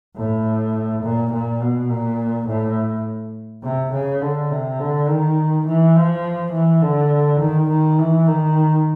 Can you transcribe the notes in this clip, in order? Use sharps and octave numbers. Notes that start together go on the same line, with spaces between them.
A2
A#2
A#2
B2
A#2
A2
C3
C#3
D3
C3
D3
D#3
E3
F3
E3
D3
D#3
D#3
E3
D#3